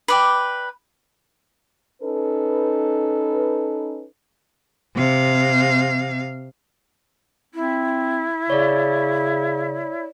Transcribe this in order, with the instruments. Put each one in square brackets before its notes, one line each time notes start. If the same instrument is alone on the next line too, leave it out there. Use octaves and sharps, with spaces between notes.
[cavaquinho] B4 D5 G5
[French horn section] C#4 D#4 A4 B4
[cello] C3 F5
[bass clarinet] C4 [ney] E4
[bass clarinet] C#3 [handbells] C#5 D5